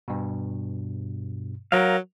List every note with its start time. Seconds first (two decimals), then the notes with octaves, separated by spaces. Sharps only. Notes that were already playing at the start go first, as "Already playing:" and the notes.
0.08 G2 B2
1.72 F#3 A#4 F5